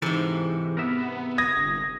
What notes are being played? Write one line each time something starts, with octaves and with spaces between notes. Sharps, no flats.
G#2 C3 E3 A4 A#4
B3 A#4 E5
D#6 G#6 A#6
G1